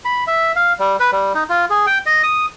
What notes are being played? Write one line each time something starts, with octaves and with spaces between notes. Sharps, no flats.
B5
E5
F5
G3
B4
G3
D#4
F4
G#4
G5
D#5
D#6